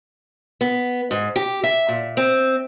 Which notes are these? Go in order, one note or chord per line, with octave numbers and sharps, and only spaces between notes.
B3
G#2
G4
E5
A#2
C4